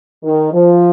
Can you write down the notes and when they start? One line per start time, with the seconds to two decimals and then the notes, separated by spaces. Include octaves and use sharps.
0.23 D#3
0.53 F3